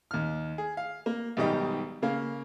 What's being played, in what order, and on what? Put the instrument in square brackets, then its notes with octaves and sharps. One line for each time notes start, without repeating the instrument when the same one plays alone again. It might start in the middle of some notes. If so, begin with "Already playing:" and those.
[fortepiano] D#2 F6
G#4
F5
A#3
B1 G#2 D#3 G3 G4 D#5
C#3 A#3 F5